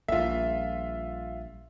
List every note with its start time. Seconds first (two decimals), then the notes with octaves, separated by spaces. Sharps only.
0.08 A#1 G3 F4 E5